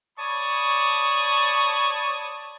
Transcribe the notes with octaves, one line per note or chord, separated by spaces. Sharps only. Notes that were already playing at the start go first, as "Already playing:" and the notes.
C#5 D5 A5 B5 C#6 D#6